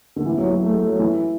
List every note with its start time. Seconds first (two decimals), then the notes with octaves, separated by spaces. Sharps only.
0.16 D3
0.26 E3
0.37 F#3
0.50 F#3
0.63 A3
0.75 A3
0.87 F#3
0.99 E3